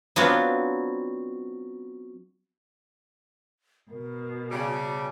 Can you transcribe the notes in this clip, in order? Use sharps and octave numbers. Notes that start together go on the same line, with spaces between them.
F#3 B3 C4 D4 F4
B2 A#4
C#3 G3 A5